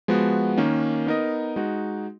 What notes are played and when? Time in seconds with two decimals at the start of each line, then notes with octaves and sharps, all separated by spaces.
0.08 F3 G#3 B3 F#4
0.57 D#3 A#3 C#4
1.07 B3 D#4 A#4 D#5
1.56 G#3 D#4 F#4